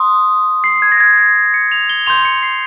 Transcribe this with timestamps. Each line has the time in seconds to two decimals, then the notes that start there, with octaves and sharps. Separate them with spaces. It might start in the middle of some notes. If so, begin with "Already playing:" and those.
Already playing: C6 D#6
0.64 C7
0.82 G#6
0.92 A#6
1.00 G#6
1.18 G#6
1.54 C#7
1.72 F7
1.89 G7
2.06 C6 G6 F7
2.25 C#7
2.43 C7